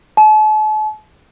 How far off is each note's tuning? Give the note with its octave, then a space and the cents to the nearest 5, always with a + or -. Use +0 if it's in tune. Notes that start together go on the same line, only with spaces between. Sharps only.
A5 -45